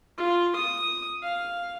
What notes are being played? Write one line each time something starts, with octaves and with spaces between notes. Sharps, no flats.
F4
D#6
F5